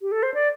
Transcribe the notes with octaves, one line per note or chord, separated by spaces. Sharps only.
G4
A4
C5
D5